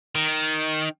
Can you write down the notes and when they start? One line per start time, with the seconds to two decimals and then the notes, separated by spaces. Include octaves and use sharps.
0.15 D#3